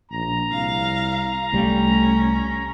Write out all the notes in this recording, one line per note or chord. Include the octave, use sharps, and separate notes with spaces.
A#1 A#5
C2 F5
C2 G3 A3 C#4